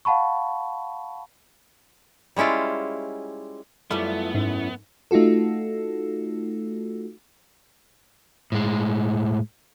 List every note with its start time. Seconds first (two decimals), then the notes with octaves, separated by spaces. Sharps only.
0.05 F5 F#5 A5 B5 C#6
2.36 G3 G#3 C#4 E4 F4
3.91 F#2 G3 A3 B3 E4 F4 A4
4.34 G#2 C#4 E4
5.11 A3 D#4 F4 F#4 A4
8.52 A2 G#3